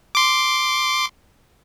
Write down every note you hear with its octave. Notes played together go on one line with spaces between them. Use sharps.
C6 D6